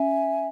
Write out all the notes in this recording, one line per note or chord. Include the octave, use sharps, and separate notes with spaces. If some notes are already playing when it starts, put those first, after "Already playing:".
Already playing: C#4 E5 G#5